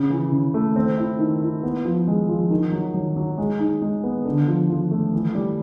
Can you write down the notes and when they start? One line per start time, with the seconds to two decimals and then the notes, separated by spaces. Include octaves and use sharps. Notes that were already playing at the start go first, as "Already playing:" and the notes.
Already playing: C#3
0.10 E3
0.32 C#3
0.54 A3
0.76 C4
0.97 E4
1.19 D#3
1.41 E4
1.63 B3
1.85 F3
2.07 G#3
2.29 F3
2.50 D#3
2.72 F#3
2.94 F#3
3.17 F#3
3.38 G#3
3.60 D#4
3.82 G#3
4.04 B3
4.25 D3
4.48 F3
4.70 F3
4.91 A3
5.13 E3
5.34 G3